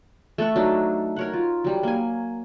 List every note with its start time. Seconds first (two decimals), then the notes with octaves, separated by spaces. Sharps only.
0.38 A3 A4 F#5 C#6
0.56 F#3 D4 D#4
1.16 A#4 C#5 F#5
1.33 F4
1.64 F#3 G3
1.83 A#3 G#5